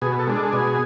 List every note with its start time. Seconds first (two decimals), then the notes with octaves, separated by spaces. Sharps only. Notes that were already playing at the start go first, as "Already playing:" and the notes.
0.02 B2 G#4
0.19 A4
0.27 G#3 D4
0.36 A4
0.53 B2 G#4